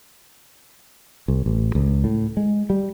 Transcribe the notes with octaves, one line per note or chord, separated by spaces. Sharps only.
C2
A1
C#2
A2
G#3
G3